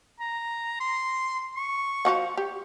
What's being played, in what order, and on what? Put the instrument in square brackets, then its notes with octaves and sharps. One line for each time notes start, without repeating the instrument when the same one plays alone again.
[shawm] A#5
C6
C#6
[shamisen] F3 F#4 F#5
G4